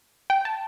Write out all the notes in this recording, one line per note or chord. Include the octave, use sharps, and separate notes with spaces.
G5
A5